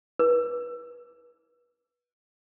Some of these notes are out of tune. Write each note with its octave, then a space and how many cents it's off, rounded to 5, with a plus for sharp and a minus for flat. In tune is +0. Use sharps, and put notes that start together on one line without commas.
B4 -30